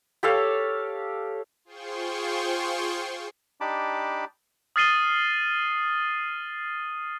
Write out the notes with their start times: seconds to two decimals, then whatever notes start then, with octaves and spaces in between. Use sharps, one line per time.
0.23 G4 A4 C#5 F5
1.65 F4 G#4 C5 G5 C6 C#6
3.61 D4 D#4 G4 A5 B5 D6
4.76 D#6 F6 A6 C7 D#7 G7